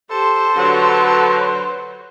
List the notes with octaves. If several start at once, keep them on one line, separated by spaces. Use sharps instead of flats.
G4 A4 C5
D3 F#3 B4